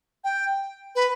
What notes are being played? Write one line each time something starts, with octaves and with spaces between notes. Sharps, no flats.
G5
B4